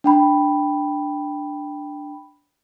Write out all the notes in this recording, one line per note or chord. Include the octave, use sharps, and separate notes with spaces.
D4 G5 B5